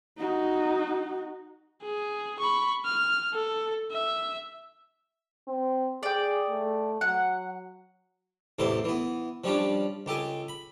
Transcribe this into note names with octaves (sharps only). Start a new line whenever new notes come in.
D#4 F#4
G#4
B5 C#6
F6
A4
E5
C4
G#4 D5 G5
A3
F#3 F#5
A1 E2 C3 E4 A4 C5
E3 B3
F3 G3 C#4 D4
C#2 G4 A4 G#5
B5